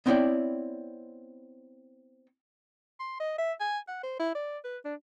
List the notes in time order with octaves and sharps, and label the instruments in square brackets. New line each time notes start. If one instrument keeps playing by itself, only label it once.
[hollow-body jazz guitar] B3 C4 E4 C#5 D5 G5
[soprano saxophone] C6
D#5
E5
G#5
F#5
C5
E4
D5
B4
D4